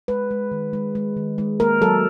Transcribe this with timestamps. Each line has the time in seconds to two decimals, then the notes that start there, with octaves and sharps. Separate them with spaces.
0.08 G#3 B4
0.31 G#3
0.51 D#3
0.73 G#3
0.95 G#3
1.17 D#3
1.38 G#3
1.60 A#3 A#4
1.81 F#3 A4